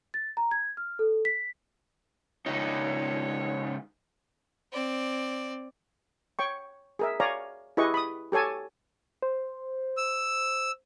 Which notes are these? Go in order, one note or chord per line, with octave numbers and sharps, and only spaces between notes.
A6
A#5
G#6
F6
A4
B6
C#2 G2 D#3 D#4 C#5
C4 D5
C#5 G5 C#6
G#4 A#4 E5
C#5 D5 F5 G#5 A#5
E4 G4 G#4 B4 D#5 C#6
B5 D#6
G4 A4 C#5 G#5 A5
C5
E6